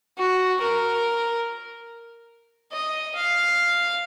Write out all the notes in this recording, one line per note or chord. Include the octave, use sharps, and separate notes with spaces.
F#4
A#4
D#5
F5